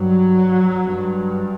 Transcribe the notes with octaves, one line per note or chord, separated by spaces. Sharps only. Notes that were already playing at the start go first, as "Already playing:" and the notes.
Already playing: G2 F#3
G2